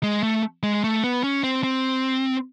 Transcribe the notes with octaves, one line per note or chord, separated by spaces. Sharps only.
G#3
A3
G#3
A3
B3
C#4
C4
C4